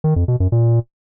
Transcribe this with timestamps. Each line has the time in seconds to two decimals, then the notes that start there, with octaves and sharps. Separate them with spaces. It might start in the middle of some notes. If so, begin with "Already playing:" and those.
0.04 D#3
0.16 F2
0.28 B2
0.40 F#2
0.52 A#2